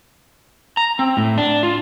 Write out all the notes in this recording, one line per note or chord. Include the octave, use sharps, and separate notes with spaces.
A#5
C4
A2
D4
F4